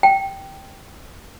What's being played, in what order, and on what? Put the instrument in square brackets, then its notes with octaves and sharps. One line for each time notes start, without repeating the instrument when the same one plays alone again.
[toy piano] G5